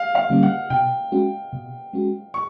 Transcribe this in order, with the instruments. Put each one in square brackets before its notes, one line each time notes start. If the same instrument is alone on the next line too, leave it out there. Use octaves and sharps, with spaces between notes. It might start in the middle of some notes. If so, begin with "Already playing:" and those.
Already playing: [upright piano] F5
F5
[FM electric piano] D3 G3 A#3 C#4
[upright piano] F#5
[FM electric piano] B2 [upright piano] G5
[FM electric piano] G#3 C#4 F#4
B2
G#3 C#4 F#4
[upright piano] C#6